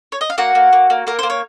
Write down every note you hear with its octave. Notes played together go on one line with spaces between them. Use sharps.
C#5
D#5
F5
A#3 F#4 F#5
A#3
A#3
A#3
A#3 A#4
A#3 C5
C#5